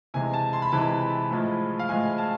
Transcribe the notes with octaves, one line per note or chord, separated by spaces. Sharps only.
C3 E3 G#3 G#5
A5
C6
B5
C3 E3 G#3 A5
B5
A2 F3 G#3
F5
A2 F3 G#3 G#5
A5